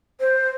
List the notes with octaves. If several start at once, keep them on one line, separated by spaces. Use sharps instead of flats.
C5